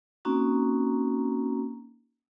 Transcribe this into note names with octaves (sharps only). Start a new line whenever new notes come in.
A#3 C4 C#4 D#4 F#4 A#5